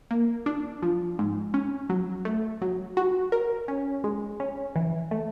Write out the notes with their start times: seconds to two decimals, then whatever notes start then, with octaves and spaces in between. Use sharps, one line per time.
0.11 A#3
0.46 D4
0.82 F3
1.19 G#2
1.54 C#4
1.90 F#3
2.25 A3
2.62 F#3
2.97 F#4
3.32 A#4
3.68 C#4
4.04 G#3
4.40 C#4
4.76 E3
5.11 A3